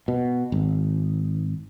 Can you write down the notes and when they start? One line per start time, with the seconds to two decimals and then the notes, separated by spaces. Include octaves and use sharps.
0.08 B2
0.52 G#1